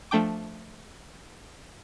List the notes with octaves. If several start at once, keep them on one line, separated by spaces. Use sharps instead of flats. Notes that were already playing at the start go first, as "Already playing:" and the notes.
F3 A3 D4 G5 D6